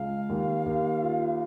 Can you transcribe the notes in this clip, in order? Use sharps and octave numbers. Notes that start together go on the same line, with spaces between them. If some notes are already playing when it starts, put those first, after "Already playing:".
Already playing: C#2 F5
D#2
D#2
F4